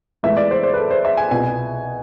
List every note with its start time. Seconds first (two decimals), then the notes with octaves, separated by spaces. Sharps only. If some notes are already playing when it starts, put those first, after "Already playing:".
0.23 A2 E3 G#3 B3 E4 E5
0.37 D5
0.51 C5
0.63 C5
0.74 B4
0.77 A4
0.91 C5
1.05 E5
1.17 G#5
1.31 C2 B2 B3 F4 G#5